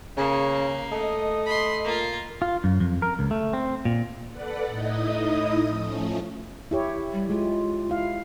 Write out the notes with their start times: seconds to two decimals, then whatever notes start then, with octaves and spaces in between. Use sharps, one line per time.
0.17 C#3 A#3
0.92 A3 D#5
1.46 B5 C6
1.84 A#3 F4
2.42 F4
2.64 F#2
2.80 F2
3.02 A#4
3.19 C#2
3.31 A3
3.53 C4
3.85 A#2
4.30 A4 B4 D5 F#5
4.65 A2 D#4 E4 D#5 D#6
5.66 F3 A3 C#4
6.71 E4 G4 C#5
7.12 G3
7.30 G#3 F4
7.90 E4 F5